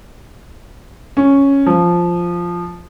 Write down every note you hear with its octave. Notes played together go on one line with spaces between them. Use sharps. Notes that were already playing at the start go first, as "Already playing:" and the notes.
C#4
F3